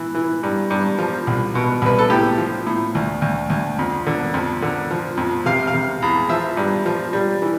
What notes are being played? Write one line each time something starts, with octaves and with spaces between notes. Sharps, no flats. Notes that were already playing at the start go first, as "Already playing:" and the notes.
Already playing: E3
E3
G2
G2
F3
C2
B2
C2 B4
A4
A2 G4
F3
A2
D2
D2
D2
F2
D3
F2
D3
F3
F2
C3 F5
F5
C3
E2
F3 E5
G2
F3
G3
E3